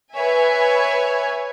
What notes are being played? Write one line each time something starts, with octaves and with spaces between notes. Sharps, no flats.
B4 C#5 E5 G#5